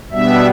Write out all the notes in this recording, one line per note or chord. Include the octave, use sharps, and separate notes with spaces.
B2 G3 B3 D4 E5